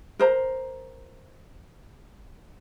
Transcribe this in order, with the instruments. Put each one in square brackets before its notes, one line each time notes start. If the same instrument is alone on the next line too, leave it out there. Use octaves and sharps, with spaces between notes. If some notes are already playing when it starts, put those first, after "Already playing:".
[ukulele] A#4 C5 A#5